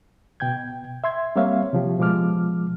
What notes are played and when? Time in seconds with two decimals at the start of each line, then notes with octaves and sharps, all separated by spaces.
0.40 B2 G5 G6 G#6
1.04 E5 C6 G#6
1.36 G3 A#3 C4 C#5 E5 F5
1.73 C3 F3 G4
1.99 B2 F3 G#3 D6 F6